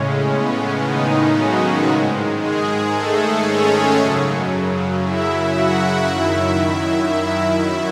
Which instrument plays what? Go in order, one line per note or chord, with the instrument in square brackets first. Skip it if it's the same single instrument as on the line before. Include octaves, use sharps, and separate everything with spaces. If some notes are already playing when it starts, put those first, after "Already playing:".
Already playing: [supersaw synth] A2 C#3 G#3 C#4
B3
D#3 D#4
F#3 F#4
G#2 D#3 G#3
G#3 G#4
A3 A4
C#4 C#5
F#2 C#3 F#3
E4 E5
F#4 F#5
F#2 D#3 F#3 E4 E5
E4 E5